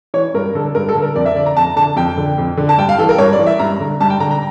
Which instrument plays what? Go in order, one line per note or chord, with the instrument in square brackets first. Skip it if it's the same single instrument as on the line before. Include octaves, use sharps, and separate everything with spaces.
[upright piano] E3 C#5
G2 A#4
D3 A4
G2 A#4
A4
D3
A#4
F2 D5
E5
D3 D5
A#5
F2 A5
D3 A5
F2 G5
D3
F2
D3
A5
G2 G5
F5
E3 A4
A#4
G2 C#5
D5
E3
E5
G2 A#5
D3
G2 A5
G5
D3 A#5
A#5